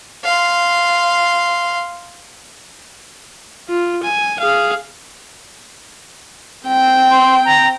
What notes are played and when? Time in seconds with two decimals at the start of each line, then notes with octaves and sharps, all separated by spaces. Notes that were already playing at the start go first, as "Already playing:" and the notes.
0.24 F5 C6
3.69 F4
4.03 G#5
4.40 G#4 F5
6.66 C4 G5
7.11 C6
7.45 A#5